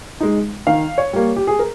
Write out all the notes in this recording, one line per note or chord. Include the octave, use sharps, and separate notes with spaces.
G#3 D#4
D#3 F5
C#5
G3 A#3
G4
G#4
A#4